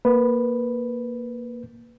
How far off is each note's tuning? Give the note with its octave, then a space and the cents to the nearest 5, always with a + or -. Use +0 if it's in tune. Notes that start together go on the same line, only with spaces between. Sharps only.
A#3 +5 B4 +0